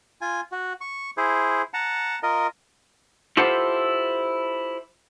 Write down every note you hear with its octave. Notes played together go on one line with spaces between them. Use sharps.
F4 G#5
F#4
C#6
E4 G#4 C5
F#5 A5 A#5
F4 A#4 D#5
E4 F4 G4 A4 C5 F#5